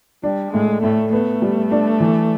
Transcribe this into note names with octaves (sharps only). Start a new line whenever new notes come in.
G3 D4
A2 G#3
A2 A3
A3 B3
G3
D4
E3